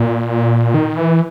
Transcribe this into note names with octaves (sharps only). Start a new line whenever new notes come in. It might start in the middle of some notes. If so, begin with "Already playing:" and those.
Already playing: A#2
D#3
E3